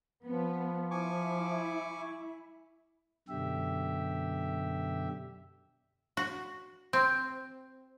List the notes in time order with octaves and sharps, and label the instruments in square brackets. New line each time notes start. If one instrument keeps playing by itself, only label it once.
[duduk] F3 [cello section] B3
[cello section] E4 [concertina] G#5 C#6 D6
[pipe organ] F#2 B2 D3 G4 E5
[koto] F#4
C4